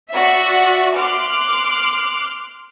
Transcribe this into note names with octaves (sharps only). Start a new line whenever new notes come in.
F#4 D5 E5
C6 D6 F6 F#6